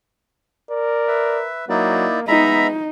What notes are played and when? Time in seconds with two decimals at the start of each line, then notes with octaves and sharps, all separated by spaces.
0.70 A#4 D5
1.08 B4 E5
1.69 F#3 A#3 D#4 E4 D5
2.28 G#3 B3 D#4 E5 A#5 B5